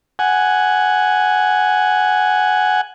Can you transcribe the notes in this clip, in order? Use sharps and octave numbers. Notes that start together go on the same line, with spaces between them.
F#5 G#5